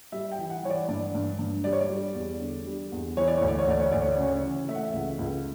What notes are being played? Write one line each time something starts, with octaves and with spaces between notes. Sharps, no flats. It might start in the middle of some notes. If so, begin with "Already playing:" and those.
G3 E5
G5
E3
F#5
E3 C#5
D5
G2 D5
G2
G2
G3 D5
C#5
D5
G3
E2
D3
G3
E2
E3 C#5
D5
D2 C#5
D5
C#5
D2 D5
C#5
D2 D5
C#5
D5
C#3
C#5
E3
A3 E5
F#5
E5
C#2
C#2